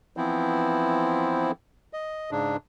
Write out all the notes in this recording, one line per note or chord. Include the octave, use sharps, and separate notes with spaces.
E3 F3 B3 C4 E4
D#5
G#2 C#3 D4